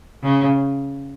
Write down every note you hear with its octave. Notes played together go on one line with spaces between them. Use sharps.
C#3